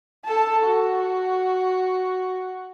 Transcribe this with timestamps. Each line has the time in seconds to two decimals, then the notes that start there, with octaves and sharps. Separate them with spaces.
0.25 A4 A5
0.63 F#4